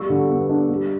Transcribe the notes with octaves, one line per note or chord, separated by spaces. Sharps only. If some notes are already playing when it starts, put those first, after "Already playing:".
Already playing: G3 C#6 E6
D3
B3
D4
G3